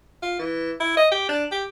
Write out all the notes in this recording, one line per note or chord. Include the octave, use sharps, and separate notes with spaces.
F4
E3
E4
D#5
G4
D4
G4